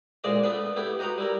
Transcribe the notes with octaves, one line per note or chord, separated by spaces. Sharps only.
D2 A#2 G#3 D5 D#5
A3 B3 D4 B4
A3 B3 E4 G4
D#4 F#4 G4 B4 A#5
G3 E4 A#4